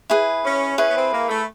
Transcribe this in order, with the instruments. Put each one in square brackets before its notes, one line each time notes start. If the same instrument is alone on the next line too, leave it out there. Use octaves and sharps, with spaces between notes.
[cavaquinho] E4 G#4 B4
[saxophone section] C#4
[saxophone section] C#4 [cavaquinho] E4 G#4 B4
[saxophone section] B3
C4
A#3
A3